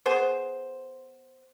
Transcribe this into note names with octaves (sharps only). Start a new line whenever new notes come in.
B3 G#4 C5